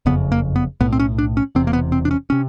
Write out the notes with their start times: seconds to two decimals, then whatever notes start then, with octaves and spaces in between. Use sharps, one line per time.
0.06 F#1 F2 C#3 B3
0.32 A#3
0.56 B3
0.80 B1 A2 B3
0.93 C4
1.00 C#4
1.18 D4
1.37 C#4
1.55 E1 E2 C3 C4
1.67 A#3
1.73 B3
1.92 C4
2.05 D4
2.11 C#4
2.30 C3 C#4